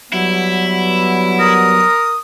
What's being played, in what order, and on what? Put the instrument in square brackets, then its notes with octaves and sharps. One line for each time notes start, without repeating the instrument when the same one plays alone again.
[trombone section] F#3 G3 B3 [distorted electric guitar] E4
[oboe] A#4 [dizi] D#6